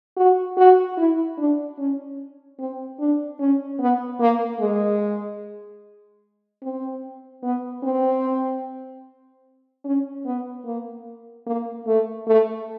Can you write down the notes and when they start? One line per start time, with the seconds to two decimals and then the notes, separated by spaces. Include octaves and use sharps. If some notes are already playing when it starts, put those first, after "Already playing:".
0.17 F#4
0.57 F#4
0.97 E4
1.38 D4
1.78 C#4
2.59 C4
2.99 D4
3.39 C#4
3.80 B3
4.20 A#3
4.60 G#3
6.62 C4
7.43 B3
7.83 C4
9.85 C#4
10.26 B3
10.66 A#3
11.46 A#3
11.86 A3
12.27 A3